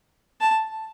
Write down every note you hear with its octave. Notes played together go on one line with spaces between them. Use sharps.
A5